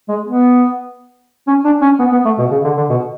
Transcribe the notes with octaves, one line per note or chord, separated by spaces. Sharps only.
G#3
B3
C#4
D4
C#4
B3
B3
A3
B2
C#3
D3
D3
B2